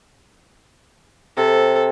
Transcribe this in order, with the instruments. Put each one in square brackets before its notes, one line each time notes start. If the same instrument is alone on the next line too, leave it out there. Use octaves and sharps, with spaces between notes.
[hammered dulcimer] C3 [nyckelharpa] A4